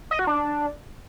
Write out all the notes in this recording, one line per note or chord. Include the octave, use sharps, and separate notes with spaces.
D#5
F#4
D4